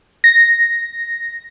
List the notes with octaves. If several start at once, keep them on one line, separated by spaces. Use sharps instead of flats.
A#6